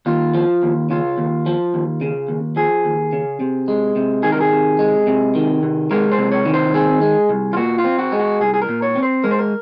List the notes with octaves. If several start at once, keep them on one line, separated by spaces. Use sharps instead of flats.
D#2 F4
F3
D#2
C#3 F4
D#2
F3
D#2
C#3
D#2
F3 G#4
D#2
C#3
C3
G#3
C3
D#3 G#4
A#4
G#4
C3
G#3
C3
D#3
C3
G#3 A#4
C5
C3
C#5
D#3
C5
C4 G#4
G#3
C2
F4
A#2 F#4
F4
C4
F#4
G#3
F#4
C2 G#4
G#4
A#4
A#2
C#5
C4
C5
G#3 A#4
C5
A#4